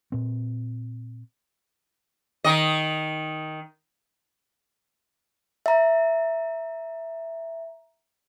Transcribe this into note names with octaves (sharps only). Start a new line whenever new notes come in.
A#2 C4
D#3 D#5
E5 A#5